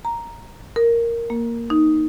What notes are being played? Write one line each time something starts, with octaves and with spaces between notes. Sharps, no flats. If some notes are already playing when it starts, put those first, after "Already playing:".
A#5
A#4
A#3
D#4